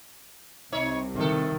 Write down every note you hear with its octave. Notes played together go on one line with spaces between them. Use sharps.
C2 C3 D#4 C#5
A2 D#3 A4